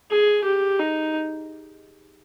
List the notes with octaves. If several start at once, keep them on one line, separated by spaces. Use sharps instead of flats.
G#4
G4
D#4